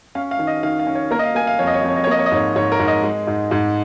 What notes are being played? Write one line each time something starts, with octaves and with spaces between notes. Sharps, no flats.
C#4 F5
F5
D#3
D#5
D#3 F5
F5
C#4
C#5
A#3 A#4
D#5
F5
A#3 G#5
F5
F2 C#5
D#5
C#5
F2 D#5
C#5
D#5
C#5
A#3 D#5
C#5
D#5
G#2 C#5
G#2 C#5
A#4
G#2
D#5
G#3
G#2
G#2